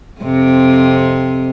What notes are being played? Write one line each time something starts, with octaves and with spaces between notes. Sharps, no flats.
F2 C3